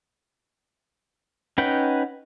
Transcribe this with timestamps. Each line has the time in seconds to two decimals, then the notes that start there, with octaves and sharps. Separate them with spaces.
1.58 C#4 D#4 B4 F#5 G5